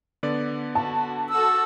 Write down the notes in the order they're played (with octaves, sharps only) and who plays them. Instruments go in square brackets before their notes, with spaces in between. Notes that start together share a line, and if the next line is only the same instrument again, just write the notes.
[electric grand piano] D3 B3 D5
[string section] F#4 [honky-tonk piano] A5
[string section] F#4 A4 [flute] E6